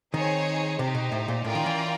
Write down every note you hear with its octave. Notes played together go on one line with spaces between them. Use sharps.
D#3 C4 D#4 G#4 C#5
C3 D#4 G4 C5
B2
A2
A#2
A2 C#4 F4 A#4 D5 G5
D#3
E3